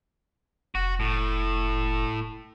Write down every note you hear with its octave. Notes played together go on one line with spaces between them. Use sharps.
F1 F#4
A2